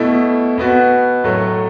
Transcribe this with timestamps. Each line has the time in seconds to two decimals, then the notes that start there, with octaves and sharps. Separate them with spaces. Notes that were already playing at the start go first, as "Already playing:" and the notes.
Already playing: B2 A3 E4
0.58 B2 B3 F#4
1.24 A2 F#3 A3